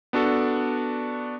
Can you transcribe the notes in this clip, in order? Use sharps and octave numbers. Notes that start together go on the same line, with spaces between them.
B3 D4 F#4 A4